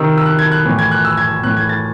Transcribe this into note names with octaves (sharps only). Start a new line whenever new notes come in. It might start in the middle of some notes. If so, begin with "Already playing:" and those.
Already playing: C3 D#3 E6
E6
F#6
G#6
F#6
A2 E3
G#6
F#6
E6
G#6
A2 E3 F#6
G#6
A6